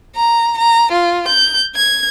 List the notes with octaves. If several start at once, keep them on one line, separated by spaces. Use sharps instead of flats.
A#5
A#5
F4
G6
G#6